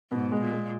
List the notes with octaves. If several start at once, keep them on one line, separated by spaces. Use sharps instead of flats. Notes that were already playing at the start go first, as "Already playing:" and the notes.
G#2 B2
G#3
A#2
G#3